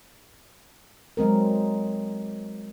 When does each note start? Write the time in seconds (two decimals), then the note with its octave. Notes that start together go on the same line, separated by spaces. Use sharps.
1.17 F#3 G#3 C4 A#4